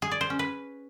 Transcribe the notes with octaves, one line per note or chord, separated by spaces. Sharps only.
G#4
D5
C5
C#4
B4